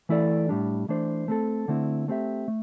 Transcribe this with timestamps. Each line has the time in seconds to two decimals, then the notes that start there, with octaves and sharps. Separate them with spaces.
0.09 E3 A3 E4 A4 D5
0.49 A2 G3 D4
0.89 E3 A3 D4 C5
1.28 A3 C4 A4
1.68 D3 A3 C4 E4
2.08 A3 C4 G4 E5
2.48 A3